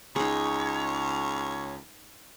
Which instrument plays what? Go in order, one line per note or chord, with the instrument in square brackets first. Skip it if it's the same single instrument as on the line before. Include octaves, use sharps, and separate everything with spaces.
[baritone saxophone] C#2 [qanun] D#4 G#4 [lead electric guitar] C#5